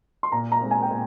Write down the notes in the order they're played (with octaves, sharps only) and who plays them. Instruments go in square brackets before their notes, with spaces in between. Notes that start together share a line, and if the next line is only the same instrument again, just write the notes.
[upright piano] C6
[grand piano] A#2 [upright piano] A#5
[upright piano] A#5
[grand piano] G#3 C4
[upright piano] G#5
G5
[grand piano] A#2